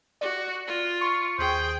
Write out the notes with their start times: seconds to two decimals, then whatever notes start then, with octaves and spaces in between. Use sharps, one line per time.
0.21 F#4 D5
0.67 F4
1.01 C6 C#6
1.39 D#2 G#4 C5 G5